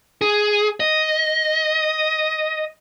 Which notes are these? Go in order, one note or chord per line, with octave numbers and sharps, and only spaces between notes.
G#4
D#5